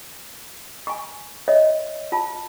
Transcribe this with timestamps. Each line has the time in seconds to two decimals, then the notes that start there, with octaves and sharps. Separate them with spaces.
0.87 G#5 C#6
1.48 C#5 D#5 E5
2.12 F4 A5